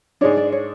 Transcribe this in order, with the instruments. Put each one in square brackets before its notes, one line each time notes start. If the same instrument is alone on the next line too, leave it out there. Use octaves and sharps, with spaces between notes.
[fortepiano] G#2 G#3 D4 [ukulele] C#5
[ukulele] D5
C#5